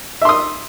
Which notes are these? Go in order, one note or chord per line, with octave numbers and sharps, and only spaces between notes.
E5 C6 D#6